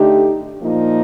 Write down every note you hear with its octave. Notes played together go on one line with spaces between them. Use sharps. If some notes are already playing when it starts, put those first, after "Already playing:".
Already playing: D3 A3 D#4 G4
A#2 F3 A#3 D#4